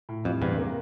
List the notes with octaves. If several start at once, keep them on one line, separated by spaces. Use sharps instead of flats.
A2
F2 G3
E2 G2 C3
A#3